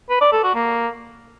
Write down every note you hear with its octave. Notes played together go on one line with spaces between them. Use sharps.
B4
D5
A4
F#4
A#3